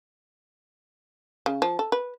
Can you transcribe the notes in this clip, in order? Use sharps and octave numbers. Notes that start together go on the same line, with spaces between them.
C#3
F3
A4
B4